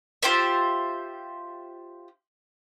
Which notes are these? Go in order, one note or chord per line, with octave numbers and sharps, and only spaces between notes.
F4 G4 C5 E5